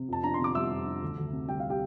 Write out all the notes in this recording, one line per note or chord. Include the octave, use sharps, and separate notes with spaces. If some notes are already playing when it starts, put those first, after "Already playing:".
Already playing: C3
F2 A5
D4 A#5
C6
C3 D6
G3 E5 E6
F2
D4
D2
D2
C3
G3 G5
F5
G4 G5